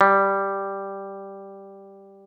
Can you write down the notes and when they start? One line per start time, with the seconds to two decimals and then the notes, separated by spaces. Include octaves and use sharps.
0.01 G3